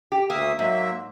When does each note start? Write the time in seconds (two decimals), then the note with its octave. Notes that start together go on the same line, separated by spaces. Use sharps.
0.12 G4
0.30 D2 A#3 E5 D#6
0.59 G#2 F#3 A#3 E5